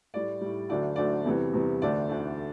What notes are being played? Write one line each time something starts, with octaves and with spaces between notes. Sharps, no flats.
A2 G3 D5
A2 G3
D2 D3 F#3 A3 D5
D2 D3 F#3 A3 D5
E2 C3 E3 G3
E2 C3 E3 G3
D2 D3 A3 D5
D2 D3 A3